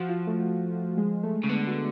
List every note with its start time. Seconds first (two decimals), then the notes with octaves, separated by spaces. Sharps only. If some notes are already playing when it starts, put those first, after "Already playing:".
Already playing: F3 F#4
0.09 F4
0.27 A3
0.97 G#3
1.23 A3
1.44 C#3
1.49 D3 B3
1.67 F#4